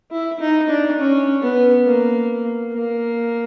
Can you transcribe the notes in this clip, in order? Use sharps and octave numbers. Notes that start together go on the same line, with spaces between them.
E4
D#4
D4
C#4
B3
A#3
A#3